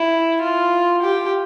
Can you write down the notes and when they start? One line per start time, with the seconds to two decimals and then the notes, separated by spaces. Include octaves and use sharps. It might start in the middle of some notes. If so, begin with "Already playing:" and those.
Already playing: E4
0.42 F4
1.02 G4